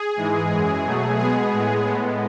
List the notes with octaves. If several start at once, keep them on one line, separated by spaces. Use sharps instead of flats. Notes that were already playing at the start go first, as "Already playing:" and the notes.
Already playing: G#4
G#2 E3 G#3
F#2 E3 G#3
B2 F#3 A3
B2 G#3 B3 G#4
A2 G#3 B3
A2 G#3 B3